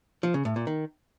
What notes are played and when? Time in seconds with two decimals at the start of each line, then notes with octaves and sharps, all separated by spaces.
0.23 F3
0.34 C#3
0.45 A2
0.56 A#2
0.67 D#3